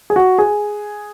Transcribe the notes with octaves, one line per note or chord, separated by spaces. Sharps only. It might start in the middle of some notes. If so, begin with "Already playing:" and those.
G#4
F#4
G#4